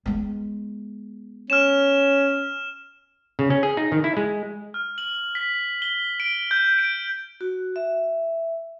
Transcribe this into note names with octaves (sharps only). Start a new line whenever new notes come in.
G#3 B3
C#4 F6 E7
C#3
C#4
G#4
D#4
D#3
E4
G#3
F6
F#7
B6
G7
D7
G6
D7
F#4
E5